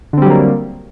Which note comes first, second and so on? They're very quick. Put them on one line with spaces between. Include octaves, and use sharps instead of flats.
D3 C4 G3 F#3 A#3